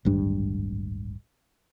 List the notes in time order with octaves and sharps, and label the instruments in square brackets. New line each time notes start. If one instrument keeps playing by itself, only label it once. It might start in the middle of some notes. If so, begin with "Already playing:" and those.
[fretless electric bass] D1 G#1 G2 D4